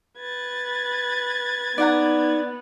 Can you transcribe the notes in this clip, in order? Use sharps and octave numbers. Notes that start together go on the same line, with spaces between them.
B4 G#6 A6
B3 D#4 D5 F#5 A#5